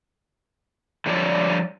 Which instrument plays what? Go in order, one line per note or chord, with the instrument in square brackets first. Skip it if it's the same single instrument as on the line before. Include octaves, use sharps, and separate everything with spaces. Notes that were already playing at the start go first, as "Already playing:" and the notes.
[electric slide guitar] D3 F3 G3 C#5 D5